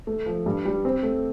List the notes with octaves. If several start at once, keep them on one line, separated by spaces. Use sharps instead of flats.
A3
F3
G2
G3
C4
A3